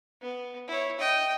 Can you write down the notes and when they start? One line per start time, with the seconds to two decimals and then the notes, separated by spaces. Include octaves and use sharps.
0.21 B3
0.68 E4 C#5
0.99 D#5 G5